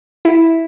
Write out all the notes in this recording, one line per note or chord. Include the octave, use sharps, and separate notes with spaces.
E4